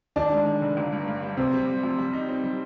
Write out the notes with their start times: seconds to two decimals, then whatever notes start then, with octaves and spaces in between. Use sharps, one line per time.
0.16 D#3 D4
0.32 G#3
0.46 D#3
0.62 F1
0.77 G1
0.92 G2
1.07 G2
1.22 G3
1.37 C3 C4
1.53 G3
1.67 G3
1.83 F2
1.98 G3
2.13 D#4
2.29 C4
2.44 G3